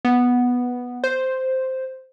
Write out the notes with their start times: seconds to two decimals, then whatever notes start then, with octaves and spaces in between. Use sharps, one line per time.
0.05 B3
1.04 C5